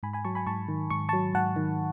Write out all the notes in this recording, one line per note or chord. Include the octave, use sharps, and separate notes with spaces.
G#2 G#5 B5
G#5 B5
F#3 A5 C#6
G#5 B5
G#2 A5 C#6
D#3
G#2 C#6
A5 C#6
F#3
G#2 F#5 A5
D#3